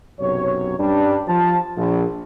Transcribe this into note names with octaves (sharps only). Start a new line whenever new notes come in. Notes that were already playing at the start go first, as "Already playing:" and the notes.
B1 F#2 C3 C#5
G2 G3 C#4 D4
F3 A5
A#1